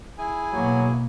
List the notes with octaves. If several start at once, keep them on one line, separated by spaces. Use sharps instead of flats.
E4 G#4 G#5
B2 F#3 A#3